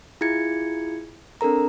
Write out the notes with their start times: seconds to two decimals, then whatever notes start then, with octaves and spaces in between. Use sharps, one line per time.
0.21 E4 F4 G#4 G#6 C#7
1.41 C4 D4 A4 A#4 A#5